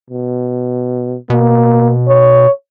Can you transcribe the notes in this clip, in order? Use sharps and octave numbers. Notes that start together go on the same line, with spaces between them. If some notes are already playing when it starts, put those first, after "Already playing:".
B2
B2 A#3
C#5